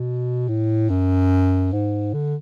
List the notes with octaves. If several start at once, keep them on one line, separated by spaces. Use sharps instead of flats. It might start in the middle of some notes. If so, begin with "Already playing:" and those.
Already playing: B2
A2
F#2
G#2
D3